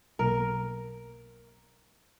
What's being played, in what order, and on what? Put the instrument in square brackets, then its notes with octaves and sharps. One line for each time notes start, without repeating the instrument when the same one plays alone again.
[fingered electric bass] B1 B2 F#3 A#3 [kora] A#4